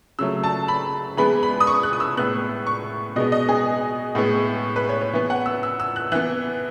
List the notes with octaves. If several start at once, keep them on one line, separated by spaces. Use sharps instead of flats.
C#3 F#3 A3 E6
A5
B5
E3 G#3 B3 B5
B5
D#6
C#6
F#6
D#6
E6
A2 G#3 B3 F#6
C#6
B2 G#3 B3 D#5
D#5
G#4
A2 G#3 B3
B4
C#5
C#5
E3 B3
F#5
E6
E6
E6
F#6
E3 B3 F#6